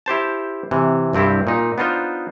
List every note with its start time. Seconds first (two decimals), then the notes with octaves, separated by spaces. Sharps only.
0.06 E4 G4 C5 A5
0.71 C3 E3
1.13 C2 G2 C4 E4 G4
1.47 A#2 D#4
1.78 B3 D4 D#4 F4 C5